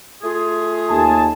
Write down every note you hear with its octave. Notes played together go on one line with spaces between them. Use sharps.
A3 F4 G#4
D#2 G#5 A5